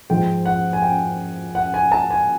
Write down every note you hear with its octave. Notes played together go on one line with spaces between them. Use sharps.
G#2 F3 G#3 G5
F#5
G#5
G5
F#5
G#5
A5
G#5